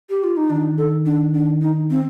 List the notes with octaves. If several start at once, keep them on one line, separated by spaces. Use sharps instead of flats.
G4
F4
D#4
D#3 D4
A4
D4
D4
D#4
C4